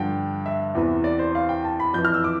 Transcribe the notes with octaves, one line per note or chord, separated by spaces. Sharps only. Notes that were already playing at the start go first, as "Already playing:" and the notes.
Already playing: G2 D3 F3 G5
E5
E2 C3 E3
D5
C5
F5
G5
A5
B5
F2 E3 G6
F6
E6
D6